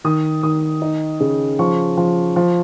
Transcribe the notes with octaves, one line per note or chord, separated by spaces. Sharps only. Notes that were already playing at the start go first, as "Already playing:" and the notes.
D#3 D#6
D#3 D#6
D#4
C#3
F3 C#6
F3
F3